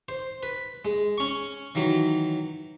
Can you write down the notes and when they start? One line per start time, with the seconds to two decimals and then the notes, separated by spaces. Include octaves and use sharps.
0.09 C5
0.43 B4
0.85 G#3
1.18 C#4 C#6
1.75 D#3 E3 F#3